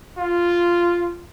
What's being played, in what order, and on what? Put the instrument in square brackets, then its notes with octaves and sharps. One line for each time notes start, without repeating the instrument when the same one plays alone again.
[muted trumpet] F4